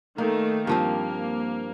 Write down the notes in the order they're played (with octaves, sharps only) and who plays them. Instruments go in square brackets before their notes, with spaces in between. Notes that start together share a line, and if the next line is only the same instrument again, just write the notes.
[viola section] D#3 A3 [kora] A#3
[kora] G2 F3 C4 [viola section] A#3